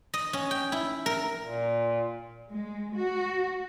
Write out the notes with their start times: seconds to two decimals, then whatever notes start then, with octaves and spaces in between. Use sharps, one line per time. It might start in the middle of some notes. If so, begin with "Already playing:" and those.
0.14 D#5
0.33 C#4
0.51 G5
0.72 E4
1.06 A#4
1.41 A#2
2.51 G#3
2.95 F#4